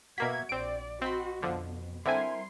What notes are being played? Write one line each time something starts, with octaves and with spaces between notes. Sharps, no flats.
B2 A#3 F#4 E5 G#6 B6
A#1 C4 D5 D7
C4 F#4 D#5 B5 C6
F2 B2 D3 F3
D3 G3 C4 E4 A#4 C5 G#5 C6